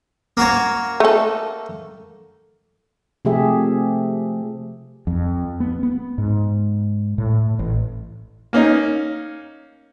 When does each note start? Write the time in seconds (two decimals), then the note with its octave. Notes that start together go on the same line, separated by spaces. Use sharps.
0.37 A#3 F#4 C#5
1.00 A3 A4
3.25 C3 F3 A3 G4 G#4 E5
5.07 F2
5.60 B3
5.83 B3
6.18 G#2
7.18 A2
7.59 A1
8.53 A#3 C#4 D#4